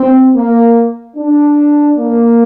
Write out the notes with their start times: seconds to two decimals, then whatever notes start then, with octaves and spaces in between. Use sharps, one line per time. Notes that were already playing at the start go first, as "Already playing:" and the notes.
Already playing: C4
0.35 A#3
1.16 D4
1.97 A#3